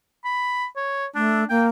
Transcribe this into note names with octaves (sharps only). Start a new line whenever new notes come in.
B5
C#5
A3 D4
A#3 G5